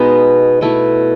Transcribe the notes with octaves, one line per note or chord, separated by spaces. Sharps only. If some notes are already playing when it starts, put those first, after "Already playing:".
Already playing: B2 G#3 B3 D#4
B2 A3 E4